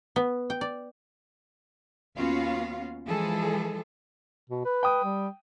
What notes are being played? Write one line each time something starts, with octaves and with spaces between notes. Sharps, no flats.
B3
G5
D5
D#2 B3 C#4 F4 F#4 F5
E3 F3 G#3 G#4 A4
B2
B4
G5 D#6
G3